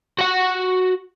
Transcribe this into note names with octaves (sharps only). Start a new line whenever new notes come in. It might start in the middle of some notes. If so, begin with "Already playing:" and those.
F#4 F#5